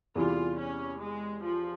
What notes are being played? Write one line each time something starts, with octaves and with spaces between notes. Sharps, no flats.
E2 C3 E3 G3 F4
C#4
G#3
F3